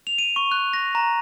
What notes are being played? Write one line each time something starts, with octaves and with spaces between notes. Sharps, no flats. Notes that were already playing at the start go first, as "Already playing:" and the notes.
F7
D#7
C#6
F#6
A#6
A#5